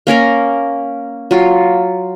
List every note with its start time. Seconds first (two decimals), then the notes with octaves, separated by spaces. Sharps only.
0.07 A#3 C#4 A#4 A#5
1.31 F#3 F4